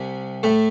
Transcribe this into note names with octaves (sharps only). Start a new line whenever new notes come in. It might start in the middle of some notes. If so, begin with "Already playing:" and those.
Already playing: C2 C3
A2 A3